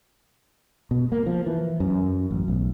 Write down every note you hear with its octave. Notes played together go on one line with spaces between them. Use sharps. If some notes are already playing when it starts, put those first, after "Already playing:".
B2
A#3
F3
E3
F#2
A1
B1